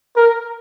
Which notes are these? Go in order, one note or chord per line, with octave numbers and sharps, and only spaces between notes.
A#4